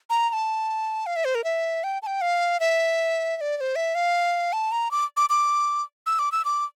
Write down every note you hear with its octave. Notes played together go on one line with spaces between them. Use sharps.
A#5
A#5
A5
F5
E5
C5
A#4
E5
G5
A5
G5
F5
E5
E5
D5
D5
C5
E5
F5
A5
A#5
D6
D6
D6
E6
D6
E6
D6